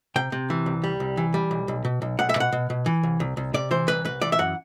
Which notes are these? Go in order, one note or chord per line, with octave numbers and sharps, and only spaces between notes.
C3 G5
C3
E3
C2
G3
C2
E3
G3
B1
B1
B2
B1
B1 F#5
E5
B2 F#5
B2
B2
E3
C2
C2
C2
C3 D5
E3 C5
C2 B4
C2 B4
E3 D5
E5
F#2 F#5